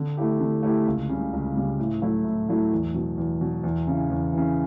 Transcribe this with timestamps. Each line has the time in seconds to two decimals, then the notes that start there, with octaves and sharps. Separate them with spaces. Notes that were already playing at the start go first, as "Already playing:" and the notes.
Already playing: D3
0.17 A3 E4 G4
0.40 D3
0.63 A3 E4 G4
0.87 C#2
1.09 C#3 G3
1.33 C#2
1.55 C#3 G3
1.79 A2
2.02 F#3 A3 E4
2.25 A2
2.49 F#3 A3 E4
2.72 E2
2.94 B2 F#3
3.18 E2
3.41 B2 F#3
3.63 E2
3.87 C#3 E3
4.10 E2
4.33 C#3 E3